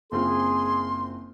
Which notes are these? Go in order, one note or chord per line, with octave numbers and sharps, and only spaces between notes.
F#1 C4 F4 G#4 C6